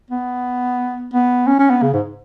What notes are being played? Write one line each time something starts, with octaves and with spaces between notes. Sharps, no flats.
B3
B3
C#4
C#4
B3
C#3
G#2